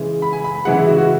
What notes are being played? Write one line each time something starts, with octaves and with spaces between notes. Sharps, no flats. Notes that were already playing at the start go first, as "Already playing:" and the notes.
Already playing: C#3 E3 G#3
B5
G#5
B5
B5
C#3 E3 G#3 F#5
E4
F#4
F#4